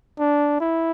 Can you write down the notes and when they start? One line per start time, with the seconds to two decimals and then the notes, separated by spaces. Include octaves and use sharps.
0.19 D4
0.61 E4